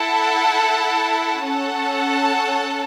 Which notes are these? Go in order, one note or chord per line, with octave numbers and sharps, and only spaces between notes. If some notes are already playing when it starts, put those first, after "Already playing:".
Already playing: E4 A4 F#5 A5
C#4 A4 F#5 A5